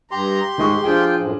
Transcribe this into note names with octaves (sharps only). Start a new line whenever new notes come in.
G2 G4 A#5 C6
G#2 D#3 G#3 C#6
F3 D4 F4 G#4 G5
F#2 A2 F3